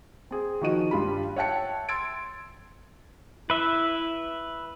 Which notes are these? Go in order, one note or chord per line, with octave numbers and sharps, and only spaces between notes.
C4 G#4
D#3 F3 F#4 D#5 D#7
G2 G3 F4 B5
C#5 E5 F#5 G5 A5 C#7
C6 E6 G#6 A6 D7
E4 B4 E5